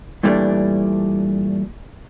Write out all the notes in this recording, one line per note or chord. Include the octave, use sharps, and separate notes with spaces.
G2 A#2 E3 G3 A3 D4